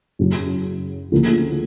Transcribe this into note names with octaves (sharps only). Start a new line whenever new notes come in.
F#2 C#3 F#3
D2 C#3 F3 A#3